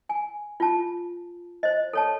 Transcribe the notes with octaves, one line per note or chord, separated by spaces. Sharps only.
G#5
F4 A5
C5 D#5
A4 C#5 A5